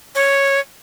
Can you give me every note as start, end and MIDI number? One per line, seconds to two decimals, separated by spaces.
0.15 0.60 73